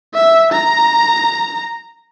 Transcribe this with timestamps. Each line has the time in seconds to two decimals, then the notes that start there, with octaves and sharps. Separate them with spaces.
0.14 E5
0.52 A#5